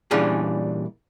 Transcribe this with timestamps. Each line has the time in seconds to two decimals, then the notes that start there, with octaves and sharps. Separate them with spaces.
0.11 A#2 E3 G3 C#4 D4 G#4